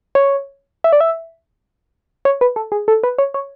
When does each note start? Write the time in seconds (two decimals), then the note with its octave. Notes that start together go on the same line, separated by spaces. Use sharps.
0.15 C#5
0.84 E5
0.93 D5
1.01 E5
2.25 C#5
2.41 B4
2.56 A4
2.72 G#4
2.88 A4
3.03 B4
3.18 C#5
3.34 C#5